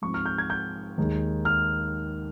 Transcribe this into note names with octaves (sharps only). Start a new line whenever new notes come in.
G#2 F3 C4 C#6
F6
G6
G#6
G6
D#2 D#3 G#3 D#4
F6